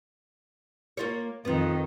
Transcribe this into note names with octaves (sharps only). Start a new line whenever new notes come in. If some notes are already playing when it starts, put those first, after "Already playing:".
A#3 F4 C#5
F2 D#3 B3 F4